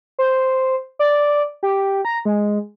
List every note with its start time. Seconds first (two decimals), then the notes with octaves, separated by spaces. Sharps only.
0.19 C5
0.99 D5
1.63 G4
2.05 A#5
2.25 G#3